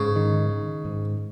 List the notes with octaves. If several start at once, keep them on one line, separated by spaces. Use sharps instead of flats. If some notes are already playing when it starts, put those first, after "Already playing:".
Already playing: G#2 C#3
D#3
D#3
G#2